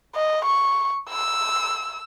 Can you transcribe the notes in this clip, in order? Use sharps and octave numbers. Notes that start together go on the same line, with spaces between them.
D#5
C#6
E6